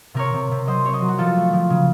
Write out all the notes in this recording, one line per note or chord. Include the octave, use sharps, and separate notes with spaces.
C3 A#4 C#5
C3
C3
F#3 C5 D#5
C4 C#5
C5 D#5
F#3
F#4
F3 F4 A4
A3
F3
C#3